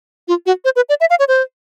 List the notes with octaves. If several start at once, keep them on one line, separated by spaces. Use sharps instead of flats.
F4
F#4
C5
B4
D5
E5
F5
C#5
C5